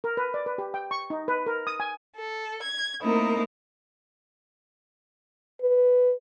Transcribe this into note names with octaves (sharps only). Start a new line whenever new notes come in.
A#4
B4
D5
B4
G4
G5
C#6
D#4
B4
A#4
D#6
G#5
A4
G#6
A3 A#3 C4 D#4 E4 A#4
B4